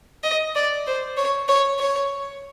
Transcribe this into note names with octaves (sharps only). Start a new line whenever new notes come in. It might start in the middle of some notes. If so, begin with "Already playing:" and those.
D#5
D5
C5
C#5
C#5
C#5